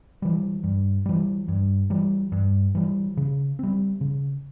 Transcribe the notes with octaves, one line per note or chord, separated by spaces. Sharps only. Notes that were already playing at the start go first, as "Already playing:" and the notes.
E3 G3
G2
E3 G3
G2
E3 G3
G2
E3 G3
C#3
G3 C4
C#3